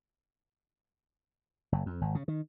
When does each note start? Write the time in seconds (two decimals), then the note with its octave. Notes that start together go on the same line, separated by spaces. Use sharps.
1.72 F#1
1.86 F2
2.01 G#1
2.15 C#3
2.28 D#3